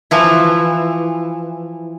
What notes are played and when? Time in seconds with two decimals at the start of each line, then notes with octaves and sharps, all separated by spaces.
0.11 E3 F3 E4